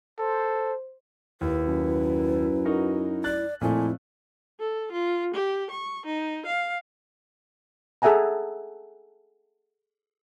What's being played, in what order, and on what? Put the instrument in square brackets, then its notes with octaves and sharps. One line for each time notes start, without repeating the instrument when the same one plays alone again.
[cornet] A4 [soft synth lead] C5
[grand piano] D#2 [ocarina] E4 [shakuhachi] B4
[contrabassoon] F#2
[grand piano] D#4 F#4 A#4
[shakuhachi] D5 [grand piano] F#6 A6
[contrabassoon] F2 [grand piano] A#2 A3 [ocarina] E4 [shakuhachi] G#5
[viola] A4
F4
G4
C#6
D#4
F5
[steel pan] G#4 A4 E5 F#5 G#5 A#5